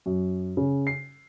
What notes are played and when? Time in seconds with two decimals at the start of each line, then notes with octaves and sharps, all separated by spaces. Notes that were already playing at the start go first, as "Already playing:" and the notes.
0.06 F#2
0.57 C#3
0.87 C7